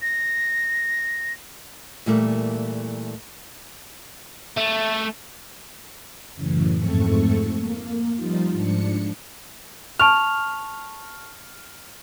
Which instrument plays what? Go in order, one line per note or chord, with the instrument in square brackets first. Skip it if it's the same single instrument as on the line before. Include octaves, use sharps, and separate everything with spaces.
[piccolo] A#6
[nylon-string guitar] A#2 E3 G3 A3 A#3
[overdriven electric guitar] A3
[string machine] F#2 A2 C#3 E3
F2 G#2 A3 C4 A4 C#6
A#3
F3 G3 D#4 F4
G#2 F3 D4 C#7
[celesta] A5 C#6 F7 [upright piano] F6